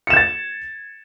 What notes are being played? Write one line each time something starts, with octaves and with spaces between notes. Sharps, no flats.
G#6 A6 C#7 E7